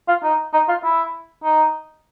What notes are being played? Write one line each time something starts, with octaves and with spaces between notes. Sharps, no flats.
F4
D#4
D#4
F4
E4
D#4